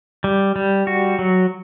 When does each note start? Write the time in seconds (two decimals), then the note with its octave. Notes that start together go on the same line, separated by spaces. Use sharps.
0.24 G3
0.56 G3
0.87 F#4
1.19 F#3